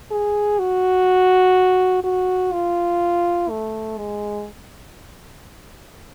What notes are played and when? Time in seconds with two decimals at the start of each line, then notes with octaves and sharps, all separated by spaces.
0.12 G#4
0.59 F#4
2.04 F#4
2.53 F4
3.50 A3
3.97 G#3